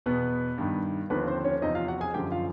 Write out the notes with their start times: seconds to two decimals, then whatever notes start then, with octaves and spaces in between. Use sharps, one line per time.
0.06 E2 B2 B3 B4
0.58 G2 D#3
1.10 D#2 D3 F3 B3 B4
1.27 C4 C5
1.44 C#4 C#5
1.62 E2 C3 F3 D#4 D#5
1.75 F4 F5
1.88 F#4 F#5
2.01 G#4 G#5
2.14 F#2 D3 F3 G4 G5
2.32 F4 F5